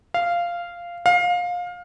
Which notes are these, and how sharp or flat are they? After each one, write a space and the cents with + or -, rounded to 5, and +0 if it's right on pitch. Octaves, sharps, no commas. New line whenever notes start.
F5 -10
F5 +25